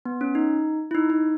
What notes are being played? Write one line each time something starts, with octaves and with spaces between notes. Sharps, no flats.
B3
C#4
D#4
E4
D#4
D#4